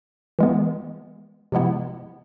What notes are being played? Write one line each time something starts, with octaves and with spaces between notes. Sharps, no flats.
E3 G#3 B3
C3 F3 G#3 B3 E4